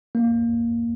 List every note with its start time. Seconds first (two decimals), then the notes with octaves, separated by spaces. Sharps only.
0.15 A#3